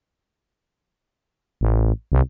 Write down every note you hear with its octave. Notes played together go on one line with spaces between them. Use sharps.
A1
C2